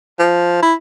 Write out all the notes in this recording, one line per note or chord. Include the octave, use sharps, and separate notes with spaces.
F3
E4